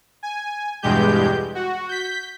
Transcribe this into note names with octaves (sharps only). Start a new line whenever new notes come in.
G#5
E2 G2 B2 G#3 G4 G6
F#4
G6 B6